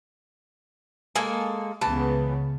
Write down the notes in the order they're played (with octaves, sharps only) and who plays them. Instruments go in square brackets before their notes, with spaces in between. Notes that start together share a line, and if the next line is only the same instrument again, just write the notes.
[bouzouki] G#3 A#3 A4 [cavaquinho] G#5
[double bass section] C#2 C#3 B3 [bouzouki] E3 [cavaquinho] A5